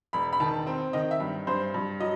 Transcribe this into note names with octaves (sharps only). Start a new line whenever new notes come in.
E1 B5
B5
D#3 A5
C4
D#3 D#5
E5
G2
G2 C5
G2
F#3 D#5